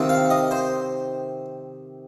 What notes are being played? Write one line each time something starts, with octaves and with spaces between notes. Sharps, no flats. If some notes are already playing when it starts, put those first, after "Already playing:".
Already playing: C3 D#3 C4 F4
F5
D#5
C5